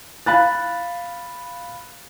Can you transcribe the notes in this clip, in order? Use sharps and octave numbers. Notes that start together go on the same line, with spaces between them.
F5 B5 F#6 A6